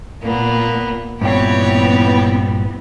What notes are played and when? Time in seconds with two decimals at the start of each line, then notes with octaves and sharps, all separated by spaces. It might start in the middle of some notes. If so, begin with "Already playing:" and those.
0.22 A#2 A#3 B3
1.21 G2 A#2 E3 B3 C4 G4 C#5 G5